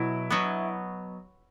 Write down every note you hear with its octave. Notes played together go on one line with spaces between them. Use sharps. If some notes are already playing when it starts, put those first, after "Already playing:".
Already playing: B2 F#3 E4
B2 F#3 B3